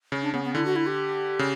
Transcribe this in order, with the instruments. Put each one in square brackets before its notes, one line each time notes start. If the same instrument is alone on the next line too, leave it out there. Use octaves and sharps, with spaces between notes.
[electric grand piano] C#3
[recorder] D4
[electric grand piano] C#3 [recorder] B3
[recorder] B3
[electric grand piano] D3 [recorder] E4
[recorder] F#4
E4
G4
[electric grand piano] C#3